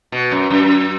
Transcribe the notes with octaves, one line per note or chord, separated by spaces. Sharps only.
B2
F#2
F#2